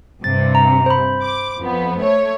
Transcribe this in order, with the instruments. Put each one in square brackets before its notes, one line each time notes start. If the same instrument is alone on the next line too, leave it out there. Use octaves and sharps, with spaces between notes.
[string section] G2 C3 [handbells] A6
[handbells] A#5
C5 B5
[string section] D6
F2 B3
A3 C#5